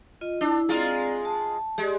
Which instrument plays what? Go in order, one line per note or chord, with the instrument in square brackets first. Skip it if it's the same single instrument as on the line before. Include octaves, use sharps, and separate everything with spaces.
[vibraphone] F4 D#5
[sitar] D4 [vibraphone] E4
[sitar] G#3 F4 [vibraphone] C4 D5 A#5
[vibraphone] A5
[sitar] G#3 [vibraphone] G4 D5